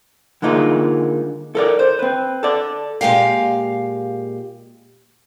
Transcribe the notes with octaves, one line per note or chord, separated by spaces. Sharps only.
D3 G#3 A#3 D#4 F4
A4 A#4 D5
C5
C4 B4
A4 D5
A#2 G#3 G4 F5